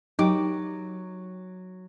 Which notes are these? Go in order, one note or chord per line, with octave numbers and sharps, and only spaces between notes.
F#3 D#4 G4 D6